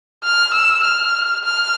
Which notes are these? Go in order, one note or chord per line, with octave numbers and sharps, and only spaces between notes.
F6
E6
F6
F6